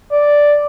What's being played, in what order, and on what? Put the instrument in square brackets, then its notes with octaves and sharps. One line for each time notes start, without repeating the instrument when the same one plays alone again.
[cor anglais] D5